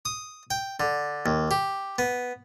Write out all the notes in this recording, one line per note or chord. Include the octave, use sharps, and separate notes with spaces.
D#6
G5
D3
D#2
G4
B3